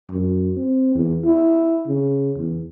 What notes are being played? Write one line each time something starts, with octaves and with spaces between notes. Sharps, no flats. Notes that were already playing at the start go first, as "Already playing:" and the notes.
F#2
C4
E2
E4
C#3
E2